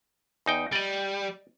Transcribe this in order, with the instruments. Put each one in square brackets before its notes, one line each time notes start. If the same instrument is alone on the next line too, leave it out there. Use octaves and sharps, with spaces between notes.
[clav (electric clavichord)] E2 D#4 G5
[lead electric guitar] G3 [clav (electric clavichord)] D5 D#5